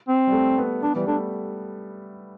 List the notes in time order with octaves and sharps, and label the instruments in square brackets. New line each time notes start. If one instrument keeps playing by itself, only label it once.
[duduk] C4
[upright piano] G3
A3
B3
[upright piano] B3 [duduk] D4
[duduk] E3 [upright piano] G3
[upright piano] A3 [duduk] D4